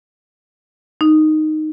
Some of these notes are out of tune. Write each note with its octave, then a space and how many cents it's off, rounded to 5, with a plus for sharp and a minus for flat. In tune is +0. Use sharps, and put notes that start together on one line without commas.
D#4 -5